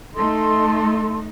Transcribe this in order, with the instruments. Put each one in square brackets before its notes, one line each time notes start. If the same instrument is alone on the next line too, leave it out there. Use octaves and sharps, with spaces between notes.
[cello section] A3 D#4 [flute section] A4 C6